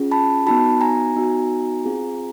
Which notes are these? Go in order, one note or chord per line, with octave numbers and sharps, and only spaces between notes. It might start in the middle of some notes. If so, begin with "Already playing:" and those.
Already playing: C#4 F4 G#4
A5 B5
B3 D#4 F#4 A5 B5
G#5 A#5
B3 D#4 F#4
C4 F4 G#4